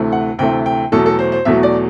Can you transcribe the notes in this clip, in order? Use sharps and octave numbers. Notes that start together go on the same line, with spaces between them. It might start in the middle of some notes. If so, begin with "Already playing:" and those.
Already playing: D2 C3 E3 A3
F#5
D2 C3 E3 A3 G5
G5
E2 B2 F#3 A3 A4
A4
C5
C5
E2 B2 F#3 A3 E5
D5